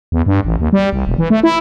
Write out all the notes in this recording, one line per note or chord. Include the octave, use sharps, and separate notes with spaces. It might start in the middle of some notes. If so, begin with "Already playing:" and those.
E2
G2
A1
D#2
G3
C2
E1
E3
A3
E4